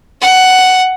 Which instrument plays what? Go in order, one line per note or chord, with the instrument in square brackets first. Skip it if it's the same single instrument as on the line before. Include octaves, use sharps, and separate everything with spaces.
[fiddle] F#5